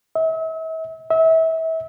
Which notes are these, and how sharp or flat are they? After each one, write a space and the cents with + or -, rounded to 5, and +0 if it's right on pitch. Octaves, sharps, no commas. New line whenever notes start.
E5 -40
E5 -30